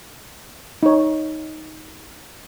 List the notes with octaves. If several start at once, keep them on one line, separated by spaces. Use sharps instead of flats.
D#4 C#5